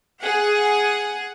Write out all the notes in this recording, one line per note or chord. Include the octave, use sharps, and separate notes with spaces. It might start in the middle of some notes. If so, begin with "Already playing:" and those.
G#4 F#5